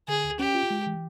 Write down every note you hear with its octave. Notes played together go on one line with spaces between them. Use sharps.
D3 G#4
D2
C#4 G4
F4
G#3
E3